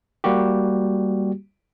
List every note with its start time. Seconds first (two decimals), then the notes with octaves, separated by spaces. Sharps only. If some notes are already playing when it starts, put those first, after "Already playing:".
0.24 G3 A#3 F#4 G4